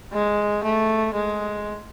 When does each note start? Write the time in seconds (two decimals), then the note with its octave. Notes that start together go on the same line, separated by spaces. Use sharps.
0.12 G#3
0.63 A3
1.14 G#3